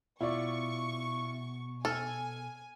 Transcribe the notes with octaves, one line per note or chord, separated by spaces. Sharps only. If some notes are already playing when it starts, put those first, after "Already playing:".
B2 E4 F4 D5 C#6
A4 G#5 F6